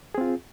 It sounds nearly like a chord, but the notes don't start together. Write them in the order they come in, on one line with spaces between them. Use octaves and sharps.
G#4 C4 F4